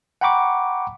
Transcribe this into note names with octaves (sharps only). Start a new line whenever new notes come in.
F#5 G5 A#5 B5 C#6 D6